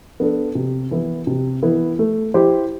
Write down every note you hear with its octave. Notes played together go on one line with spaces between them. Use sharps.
B3 D4 A4
C3
E3 B3 E4
C3
E3 B3 E4
A3
E4 G4 C5